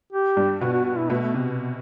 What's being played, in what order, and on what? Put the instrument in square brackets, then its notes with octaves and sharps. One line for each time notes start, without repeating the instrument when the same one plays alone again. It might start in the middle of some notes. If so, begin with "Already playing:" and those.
[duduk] G4
[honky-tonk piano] G2 G3
[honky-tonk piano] B2 B3 [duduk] F#4
[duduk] F#4
F#4
E4
[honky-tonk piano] B2 B3 [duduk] A3
[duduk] A3
[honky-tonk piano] C3